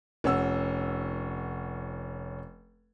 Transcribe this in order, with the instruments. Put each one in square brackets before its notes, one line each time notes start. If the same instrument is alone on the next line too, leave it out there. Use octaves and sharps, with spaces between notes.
[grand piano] F1 C#4 F#5 E6